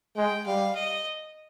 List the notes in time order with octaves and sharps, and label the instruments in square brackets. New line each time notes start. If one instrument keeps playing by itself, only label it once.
[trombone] G#3 [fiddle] G5
[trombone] G3 [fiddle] F5
[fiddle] D#5